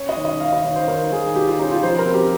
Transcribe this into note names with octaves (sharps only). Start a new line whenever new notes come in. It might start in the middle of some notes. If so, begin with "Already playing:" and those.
Already playing: C#4 C#5
D#5
D#3
D#5
D#3 F5
D#5
D#3 C#5
C5
D#3 A#4
D#3 G#4
D#3 G4
F4
C#4 D#4
F4
F3 C5
A#4
C4
G4